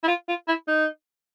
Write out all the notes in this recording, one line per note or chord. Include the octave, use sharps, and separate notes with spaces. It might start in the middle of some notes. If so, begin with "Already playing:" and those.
E4
F4
F4
E4
D#4